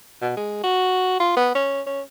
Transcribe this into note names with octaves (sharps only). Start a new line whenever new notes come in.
B2
G#3
F#4
F4
B3
C#4
C#4